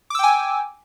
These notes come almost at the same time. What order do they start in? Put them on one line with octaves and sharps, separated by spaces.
D6 E6 G5 G#5